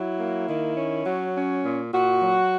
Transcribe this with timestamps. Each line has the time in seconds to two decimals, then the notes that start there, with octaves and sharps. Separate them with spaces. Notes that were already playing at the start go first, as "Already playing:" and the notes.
Already playing: F#3 E4
0.18 A#3
0.48 D#3
0.76 C#4
1.05 F#3
1.35 C#4
1.64 A#2
1.92 A#2 F#4
2.21 F#3